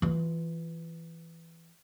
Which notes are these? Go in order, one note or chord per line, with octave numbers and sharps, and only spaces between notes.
E3 F4